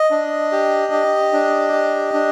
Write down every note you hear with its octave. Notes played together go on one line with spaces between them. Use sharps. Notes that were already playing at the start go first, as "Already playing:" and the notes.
Already playing: D#5
D4
G4
G4
D4
G4
D4